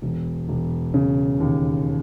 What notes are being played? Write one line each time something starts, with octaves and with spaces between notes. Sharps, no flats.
E1
E1
C#3
D#2